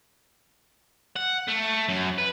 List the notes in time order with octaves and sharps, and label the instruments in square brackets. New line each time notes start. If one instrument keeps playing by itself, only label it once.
[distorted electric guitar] F#5
A3
F#2
B4